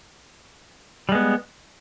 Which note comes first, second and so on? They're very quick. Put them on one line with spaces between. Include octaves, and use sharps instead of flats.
G3 G#3 B3